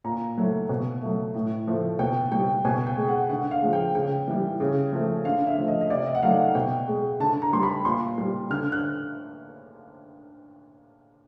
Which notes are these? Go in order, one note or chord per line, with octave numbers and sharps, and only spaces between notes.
A#2 A#5
F#3 A3
B2
F#3 A3
A2
F3 A3
B2 G5
G3 G5
B2 G#5
G5
G#3
F#5
D3 F#5
F5
F3 G#3
G5
C#3 G5
E3 G3
C#3
F3 A3
D3 F5
E5
F3 A3
D#5
D#5
C3 D5
D#5
F#5
D#3 F#3 A3 F5
F#5
B2 G5
G#3
D3 A5
A#5
G3 C6
B5
A#2 C6
G3
D3 F6
F#6